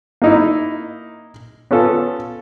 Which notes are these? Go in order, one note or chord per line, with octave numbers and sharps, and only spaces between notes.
A#3 D#4 E4
B3 C#4 F4 A4